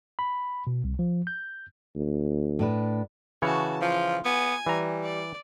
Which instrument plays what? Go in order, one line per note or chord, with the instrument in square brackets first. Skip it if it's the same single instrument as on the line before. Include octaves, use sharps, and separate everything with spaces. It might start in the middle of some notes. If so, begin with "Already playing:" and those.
[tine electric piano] B5
B2
C2
F3
G6
[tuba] D2
[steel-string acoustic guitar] A2 D4 B4
[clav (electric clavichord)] C#3 E3 C#5 [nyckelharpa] F#4 A5
[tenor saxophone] F3 [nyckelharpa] F4
[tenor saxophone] B3 [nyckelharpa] G#5
[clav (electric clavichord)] E3 A#5 [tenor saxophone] G3
[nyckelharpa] D5